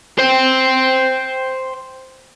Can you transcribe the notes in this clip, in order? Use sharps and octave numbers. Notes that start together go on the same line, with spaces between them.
C5 G5